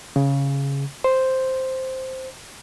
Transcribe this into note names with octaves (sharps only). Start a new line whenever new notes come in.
C#3
C5